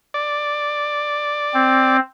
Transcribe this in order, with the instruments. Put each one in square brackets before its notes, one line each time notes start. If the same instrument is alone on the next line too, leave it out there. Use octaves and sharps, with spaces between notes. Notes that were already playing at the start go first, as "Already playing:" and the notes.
[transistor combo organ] D5
[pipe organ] C4